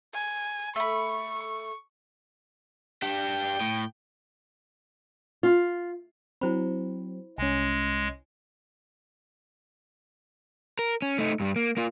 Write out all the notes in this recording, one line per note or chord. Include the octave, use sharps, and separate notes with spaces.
G#5
A3 B5 C#6
G3 D4 G5
A2
F4
F#3 C4 E4 C5 B5
C2 G#3 C#4 G#5
A#4
C#4
A3 D#4
G2 G3
A#3
A#3 F4